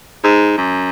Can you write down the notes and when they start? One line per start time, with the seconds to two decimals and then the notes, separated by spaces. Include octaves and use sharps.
0.24 G#2
0.58 F#2